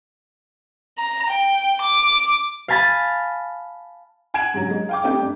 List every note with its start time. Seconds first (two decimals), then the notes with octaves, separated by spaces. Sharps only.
0.98 A#5
1.30 G5
1.81 D6
2.68 F5 G#5 A5 B5 G#6 A6
4.34 F#5 G#5 G#6 D7 E7 F#7
4.54 G#2 C#3 F#3
4.70 G#3
4.89 F5 G5 D6
5.04 A3 B3 C4 D#4 G4 G5
5.20 G2